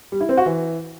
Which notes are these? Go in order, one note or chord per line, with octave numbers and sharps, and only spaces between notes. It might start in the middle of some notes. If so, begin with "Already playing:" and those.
G3
E4
C4
F#4
E3